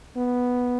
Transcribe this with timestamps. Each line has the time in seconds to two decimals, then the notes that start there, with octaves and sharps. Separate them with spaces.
0.17 B3